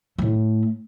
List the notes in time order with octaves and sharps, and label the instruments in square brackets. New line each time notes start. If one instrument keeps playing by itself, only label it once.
[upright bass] A2 A3